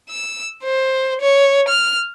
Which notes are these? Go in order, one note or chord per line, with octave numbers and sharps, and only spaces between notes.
E6
C5
C#5
F6